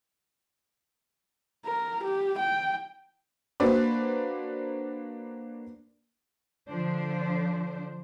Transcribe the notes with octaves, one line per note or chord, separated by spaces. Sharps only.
A#4
G4
G5
A#3 D4 F#4 B4 C5 D5
D3 F3 D4 C5